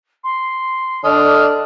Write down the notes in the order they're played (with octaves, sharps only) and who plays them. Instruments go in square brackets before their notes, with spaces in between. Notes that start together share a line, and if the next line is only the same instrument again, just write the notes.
[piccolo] C6
[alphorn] D3 [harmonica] D4 [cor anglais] D#5 [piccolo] F6